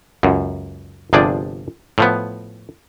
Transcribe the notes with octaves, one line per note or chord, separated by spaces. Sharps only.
C#2 F#2
G1 C3 F3 D4 G#4 D5
A2 F3 B3